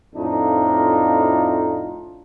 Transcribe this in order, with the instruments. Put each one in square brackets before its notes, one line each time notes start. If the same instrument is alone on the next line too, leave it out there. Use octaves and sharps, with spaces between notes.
[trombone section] F2 A2 D4 D#4 F4